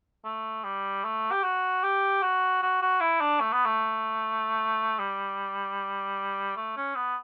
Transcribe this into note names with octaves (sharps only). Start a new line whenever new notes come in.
A3
G3
A3
G4
F#4
G4
F#4
F#4
F#4
E4
D4
A3
B3
A3
G3
A3
C#4
B3